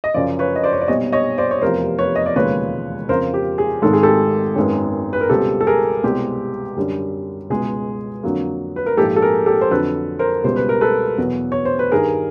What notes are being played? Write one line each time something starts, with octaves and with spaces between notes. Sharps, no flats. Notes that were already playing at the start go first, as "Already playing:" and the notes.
D#5
F#2 C#3 F3 C5 D5
B4 C#5
D#5
C5 D5
C#5
D5
B1 A#2 G3 C4 C#5 D#5
C#5 D#5
C5 D5
C#5
F1 E2 C3 F3 A#4 C5
B4 C#5
D#5
D5
E1 D#2 C#3 F3 G#3 B4 C#5
F2 C#3 F3 A#4 C5
G4
G#4
G#1 G#2 D#3 G#3 A4
G#4
G4 A4
G#1 F#2 D#3 G#3 B3
B4
A#4
C#2 B2 G3 C4 G4 A4
A4
G#4 A#4
C2 B2 G#3 C4 G4
F#2 D3 G3
C#2 B2 G#3 G#4
F2 D3 F#3 A#3
B4
A#4
A#1 G#2 F3 G4 A4
A4
G#4 A#4
G4 A4
C5
F2 D3 F#3 A4 B4
A#4 C5
C#2 B2 G3 C5
B4
A#4
A4 B4
E2 B2 F#3 B3
C#5
C5
B4
G2 D#3 G3 G#4 A#4